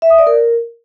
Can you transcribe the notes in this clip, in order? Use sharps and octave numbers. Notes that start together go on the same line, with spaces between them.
E5
D#6
D5
A#4